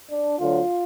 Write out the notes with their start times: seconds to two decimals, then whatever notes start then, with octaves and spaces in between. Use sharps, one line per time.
0.11 D4
0.39 D2 D3 F#3 F4